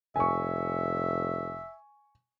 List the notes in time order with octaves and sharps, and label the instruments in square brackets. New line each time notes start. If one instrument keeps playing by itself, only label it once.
[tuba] F1 [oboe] E5 [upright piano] G#5 C#6